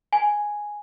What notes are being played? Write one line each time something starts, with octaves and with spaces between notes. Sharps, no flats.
G#5